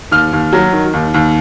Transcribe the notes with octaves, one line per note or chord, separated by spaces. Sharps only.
D#2 F6
D#2
F#3
D#3
D#2
D#2